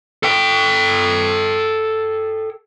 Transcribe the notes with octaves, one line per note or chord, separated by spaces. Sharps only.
A4 G5